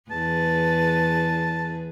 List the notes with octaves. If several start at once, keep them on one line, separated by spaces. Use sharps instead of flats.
E2 G#4 B4 A5